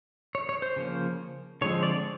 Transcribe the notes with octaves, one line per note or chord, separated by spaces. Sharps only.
C#5
C#5
C5
C#3 F3 A#3
D3 F3 G#3 C4 C#5
D5